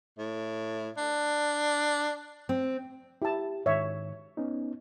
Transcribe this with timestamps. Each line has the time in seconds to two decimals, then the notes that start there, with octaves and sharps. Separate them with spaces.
0.18 A2
0.97 D4
2.49 C4
3.22 E4 G4 A5
3.66 G#2 D#3 C#5 E5
4.37 B3 C#4 D#4